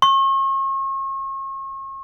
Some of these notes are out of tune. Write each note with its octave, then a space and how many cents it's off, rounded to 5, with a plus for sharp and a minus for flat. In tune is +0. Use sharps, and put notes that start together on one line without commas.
C#6 -40